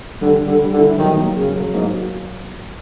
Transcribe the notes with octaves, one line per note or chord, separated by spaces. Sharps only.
D3 G3
G3
D3
G3
D3
E4
D#3 F#3
A#3
C#3 F#3
F#3
G#2 A#3
F#4